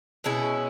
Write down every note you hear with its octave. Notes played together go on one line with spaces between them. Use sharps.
B2 G#3 C#4 E4